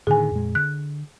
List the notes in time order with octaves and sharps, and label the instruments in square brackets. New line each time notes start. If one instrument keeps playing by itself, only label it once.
[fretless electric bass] A2 D3 D#3 [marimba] G#4 G#5
[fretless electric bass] F2 A#2 G#3
[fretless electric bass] D3 [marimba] F#6